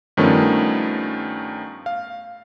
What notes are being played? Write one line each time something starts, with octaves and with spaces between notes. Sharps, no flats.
G2 D#3 F3 A3 B3 C#4
F5